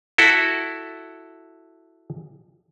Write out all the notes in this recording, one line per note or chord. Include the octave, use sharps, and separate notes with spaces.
E4 F#4 A4